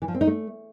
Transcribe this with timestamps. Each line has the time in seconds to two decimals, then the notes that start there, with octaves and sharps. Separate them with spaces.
0.02 E3
0.08 F3
0.14 C4
0.21 D#4
0.27 A3